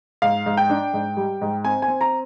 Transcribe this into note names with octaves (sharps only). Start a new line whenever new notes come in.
G#2 F5
G#2
G5
D4
G#2
G3
G#2
C4 G#5
G#5
C4
A#5